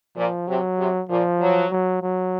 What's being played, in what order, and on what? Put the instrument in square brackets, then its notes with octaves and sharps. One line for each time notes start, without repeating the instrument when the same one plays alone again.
[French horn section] A#2 [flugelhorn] F3
[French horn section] C3 [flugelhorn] F#3
[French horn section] C3
[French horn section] A#2 [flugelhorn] F3
[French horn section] F#3
[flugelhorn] F#3
F#3